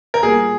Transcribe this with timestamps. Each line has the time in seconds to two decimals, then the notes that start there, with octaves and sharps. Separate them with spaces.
0.14 A#4
0.23 A#2 G3 A#3 G#4